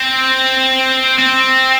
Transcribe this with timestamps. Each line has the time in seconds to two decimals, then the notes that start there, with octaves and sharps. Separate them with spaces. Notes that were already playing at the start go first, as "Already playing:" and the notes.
Already playing: C4
1.19 C4